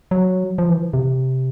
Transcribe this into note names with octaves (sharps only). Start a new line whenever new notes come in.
F#3
F3
E3
C3